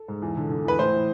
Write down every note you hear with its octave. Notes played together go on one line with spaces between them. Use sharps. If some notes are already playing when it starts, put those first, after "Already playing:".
Already playing: A4
G#2
E2
D3
D3
E2 B4
A2 C5
E3